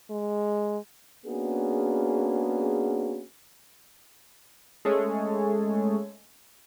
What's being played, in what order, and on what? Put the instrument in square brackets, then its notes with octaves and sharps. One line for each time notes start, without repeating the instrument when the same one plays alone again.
[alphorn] G#3
[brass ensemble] A#3 B3 C#4 D4 F#4 G#4
[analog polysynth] G#3 A3 C#4 G#4 A4 C#5